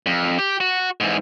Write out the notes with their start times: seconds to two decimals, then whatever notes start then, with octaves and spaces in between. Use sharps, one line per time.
0.06 F2
0.39 G4
0.60 F#4
1.00 G#2 E3